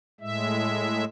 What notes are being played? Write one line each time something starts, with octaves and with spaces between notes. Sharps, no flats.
A2 G#3 E5